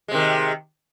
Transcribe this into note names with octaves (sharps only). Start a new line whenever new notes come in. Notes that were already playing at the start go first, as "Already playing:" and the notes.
C3 D#3 G#3